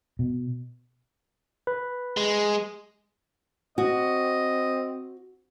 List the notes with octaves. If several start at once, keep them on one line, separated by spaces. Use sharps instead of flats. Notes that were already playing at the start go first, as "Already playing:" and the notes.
B2
B4
G#3
C4 F#4 D#5